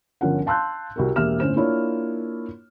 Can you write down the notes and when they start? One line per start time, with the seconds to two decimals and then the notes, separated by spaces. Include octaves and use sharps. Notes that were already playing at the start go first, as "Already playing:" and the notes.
0.21 G1 F3 C#4 A#4 F#5
0.46 F5 A5 C6 E6 F#6 G6
0.96 C2 F#4 A#4
1.16 E1 A#3 G4 E5 F6 E7
1.40 G1 A2 C#4 C5 E7
1.56 A#3 D4 E4 F4 C#5